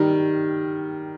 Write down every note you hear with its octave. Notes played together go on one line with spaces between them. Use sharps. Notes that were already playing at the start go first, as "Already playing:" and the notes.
Already playing: D#3 G3